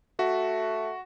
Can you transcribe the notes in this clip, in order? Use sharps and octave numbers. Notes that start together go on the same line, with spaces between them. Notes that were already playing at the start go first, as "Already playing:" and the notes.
A3 F#4